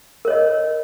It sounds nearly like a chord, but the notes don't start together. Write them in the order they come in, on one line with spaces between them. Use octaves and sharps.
A#4 C#5 D#5